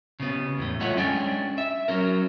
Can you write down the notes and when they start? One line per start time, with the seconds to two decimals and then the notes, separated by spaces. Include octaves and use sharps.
0.20 C#3 B3
0.58 E2 A2 A3
0.81 G#3 A3 F4 C#5 E5 F#5
0.97 G#3 C#4 D4 G5 G#5
1.58 E5
1.88 F#3 C#4 A#4